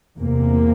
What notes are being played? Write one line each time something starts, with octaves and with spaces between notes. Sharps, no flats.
E2 C3 A#3